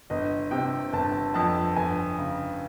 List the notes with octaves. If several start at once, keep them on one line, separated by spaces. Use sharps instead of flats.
G1 D#5
C3 G5
G1 A5
F2 A5
G1 G#5
C#3